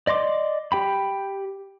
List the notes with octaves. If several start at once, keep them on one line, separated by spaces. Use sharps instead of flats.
D5 D#5 C6 D6
G4 G5 B5